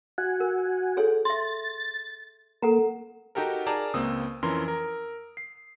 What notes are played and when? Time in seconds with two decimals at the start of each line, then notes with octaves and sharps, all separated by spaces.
0.18 F#4 F#5 G#5
0.40 A#4
0.97 G#4 A4 C#5
1.25 E5 C6 A6
2.62 A#3 A4 F#5 A#5
3.35 D#4 F#4 G4 A4 A#4
3.67 G#4 A#4 D5 A5 A#5
3.94 C#2 A#3 C4 D#6 E6
4.43 F2 E3 C#4 A#4 C6
4.68 A#4
5.37 C7